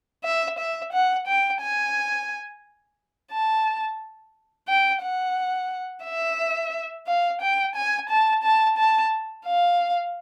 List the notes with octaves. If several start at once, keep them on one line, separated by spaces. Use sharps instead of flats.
E5
E5
F#5
G5
G#5
A5
G5
F#5
E5
F5
G5
G#5
A5
A5
A5
F5